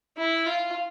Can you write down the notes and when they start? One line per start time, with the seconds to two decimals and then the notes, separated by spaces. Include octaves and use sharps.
0.18 E4
0.46 F4